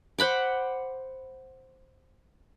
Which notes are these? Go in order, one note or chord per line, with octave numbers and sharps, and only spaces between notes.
C5 F#5 B5 D6